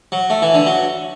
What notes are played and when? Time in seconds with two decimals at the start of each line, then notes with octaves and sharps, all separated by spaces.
0.12 F#3
0.30 A3
0.42 E3
0.55 D3
0.67 F#3